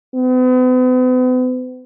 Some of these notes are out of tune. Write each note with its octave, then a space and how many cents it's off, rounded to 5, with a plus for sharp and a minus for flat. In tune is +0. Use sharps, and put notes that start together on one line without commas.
B3 +40